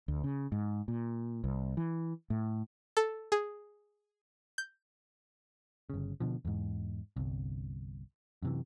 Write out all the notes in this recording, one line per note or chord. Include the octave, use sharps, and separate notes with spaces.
D2
C#3
G#2
A#2
C2
E3
A2
A4
G#4
G6
G1 C#3
B2 D3 F3
E2 G#2
G1 C2
F#2 C3 E3